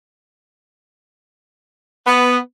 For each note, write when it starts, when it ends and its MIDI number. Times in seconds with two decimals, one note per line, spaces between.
2.06 2.37 59